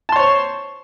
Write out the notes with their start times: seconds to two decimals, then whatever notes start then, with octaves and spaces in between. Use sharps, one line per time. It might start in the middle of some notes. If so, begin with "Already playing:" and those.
0.09 A5
0.12 C6
0.16 C#5
0.19 C5
0.23 C#6